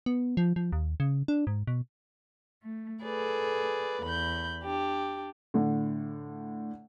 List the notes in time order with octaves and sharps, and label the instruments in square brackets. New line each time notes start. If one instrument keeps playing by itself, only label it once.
[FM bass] B3
F3
F3
D#2
C#3
D4
G#2
B2
[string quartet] A3
G#4 A4 B4 D5
E2 B5 G6
D4 G4
[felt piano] A2 D3